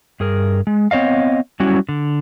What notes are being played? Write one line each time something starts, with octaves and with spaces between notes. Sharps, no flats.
G2 G#4 A#4
G#3
B3 C4 C#5 D#5 F5
F#3 G3 C#4 E4 F#4
D3